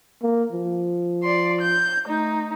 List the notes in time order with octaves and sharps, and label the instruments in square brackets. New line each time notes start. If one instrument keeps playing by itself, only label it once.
[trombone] A#3
F3
[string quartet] D5 C6
G6
A3 D#4